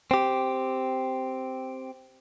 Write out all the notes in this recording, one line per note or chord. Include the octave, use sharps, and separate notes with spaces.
C4 G4